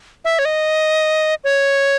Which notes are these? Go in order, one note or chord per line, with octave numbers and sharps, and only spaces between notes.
E5
C#5
D#5
C#5